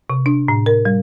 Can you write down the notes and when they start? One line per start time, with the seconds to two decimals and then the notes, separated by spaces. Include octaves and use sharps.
0.10 C3
0.26 D4
0.48 A2
0.66 A#4
0.85 G3